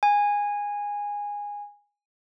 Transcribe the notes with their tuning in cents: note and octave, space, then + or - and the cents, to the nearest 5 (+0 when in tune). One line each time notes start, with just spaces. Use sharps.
G#5 -15